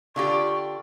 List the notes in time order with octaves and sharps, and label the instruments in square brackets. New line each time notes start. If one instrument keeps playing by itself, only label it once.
[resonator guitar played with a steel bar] D3 F4 G4 [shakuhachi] C#6